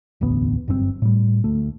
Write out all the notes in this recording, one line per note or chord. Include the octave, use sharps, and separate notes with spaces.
E1 A1 D2 B3
G1 F#2 A#2 C4
A2 G3
D2 A3